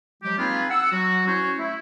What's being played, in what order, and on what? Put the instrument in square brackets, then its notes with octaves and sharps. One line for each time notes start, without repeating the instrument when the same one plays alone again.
[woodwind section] F3 F#3 G#3 G4
A#3 C4 D#4 F4 G#4 B4
F#5 E6
F#3 F#4
C#4 E4 F#4 C5 C#5
A3 E4